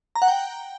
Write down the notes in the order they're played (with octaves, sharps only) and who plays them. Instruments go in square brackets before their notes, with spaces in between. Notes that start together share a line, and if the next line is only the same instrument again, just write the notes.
[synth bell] A#5
F#5
G5